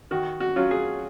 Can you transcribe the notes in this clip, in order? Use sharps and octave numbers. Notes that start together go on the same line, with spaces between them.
D#3 F#4
F#4
F#3 C#4 F4
G#4